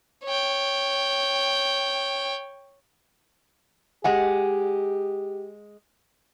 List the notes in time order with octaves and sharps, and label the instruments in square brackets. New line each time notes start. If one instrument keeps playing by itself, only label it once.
[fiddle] C#5 G5
[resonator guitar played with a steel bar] G#3 F#5 G#5 [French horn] G4